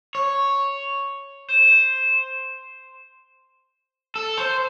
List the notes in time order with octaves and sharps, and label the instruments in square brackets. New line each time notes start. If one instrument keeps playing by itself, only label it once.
[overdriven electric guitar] C#5
C5
A4
C5